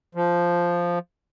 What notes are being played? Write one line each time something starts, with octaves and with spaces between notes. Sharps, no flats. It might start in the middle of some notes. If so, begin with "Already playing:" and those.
F3